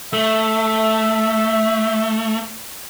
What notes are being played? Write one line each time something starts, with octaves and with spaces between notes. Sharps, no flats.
A3 E5